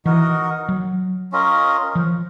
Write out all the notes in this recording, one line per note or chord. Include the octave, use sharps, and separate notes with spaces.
E3 D#4 F#4 A#4 D#5
F#3
C#4 F4 A#4 D#5
F3